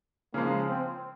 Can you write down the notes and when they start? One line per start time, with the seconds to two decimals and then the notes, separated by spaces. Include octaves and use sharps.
0.34 C#3 F3 G#3 A#3
0.69 C4